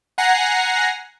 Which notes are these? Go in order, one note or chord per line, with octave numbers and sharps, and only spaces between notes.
F#5 G#5 A#5 A#6 C7